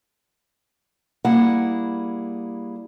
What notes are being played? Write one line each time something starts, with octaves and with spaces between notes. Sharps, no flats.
G3 A#3 E4 G#4 F#5